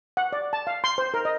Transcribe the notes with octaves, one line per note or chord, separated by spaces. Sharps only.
F#5
D5
A5
F5
C6
C5
A#4
D#5